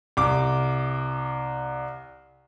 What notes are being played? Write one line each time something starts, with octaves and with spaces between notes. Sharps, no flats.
C2 D6